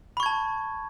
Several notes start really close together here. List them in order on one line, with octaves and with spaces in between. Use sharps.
B5 C#6 G#6 A5